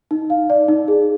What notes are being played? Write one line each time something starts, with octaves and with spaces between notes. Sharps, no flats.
D#4
F5
D5
D#4
G#4